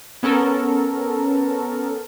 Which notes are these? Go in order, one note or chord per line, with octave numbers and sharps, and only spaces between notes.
B3 C#4 A4 A#4